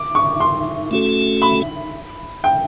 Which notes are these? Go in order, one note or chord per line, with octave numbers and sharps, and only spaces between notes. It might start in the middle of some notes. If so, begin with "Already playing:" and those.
Already playing: D6
C#6
C6
A3 C#4 F#4 A4
B5
G5